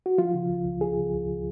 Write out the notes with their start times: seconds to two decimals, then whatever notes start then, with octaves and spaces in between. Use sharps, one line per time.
0.06 F#4
0.18 F3 F4
0.34 C#3
0.49 C#2
0.65 C#2
0.81 F3 G#4
0.97 C#3
1.13 C#2